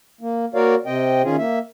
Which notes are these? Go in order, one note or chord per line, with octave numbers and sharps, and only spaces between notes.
A#3
A#3 F#4 A#4 C#5 D5 F5
C3 C4 D#5 G5
D#3 C#4 F4 G#4
A#3 E5